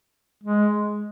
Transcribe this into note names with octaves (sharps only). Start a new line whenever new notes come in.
G#3